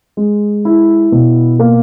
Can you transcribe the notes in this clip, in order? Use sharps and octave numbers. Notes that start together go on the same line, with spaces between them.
G#3
E4
B2
A#3